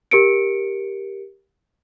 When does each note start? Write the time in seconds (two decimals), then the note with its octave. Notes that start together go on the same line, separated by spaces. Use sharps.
0.11 G4 A#4 C#7 D7